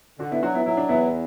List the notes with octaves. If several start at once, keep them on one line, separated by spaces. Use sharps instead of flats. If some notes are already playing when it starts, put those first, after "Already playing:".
D3 D4 F#4
B3 E4
F#3 D4 F#4
B3 E4
F#3 E4
D4
E2 B3 E4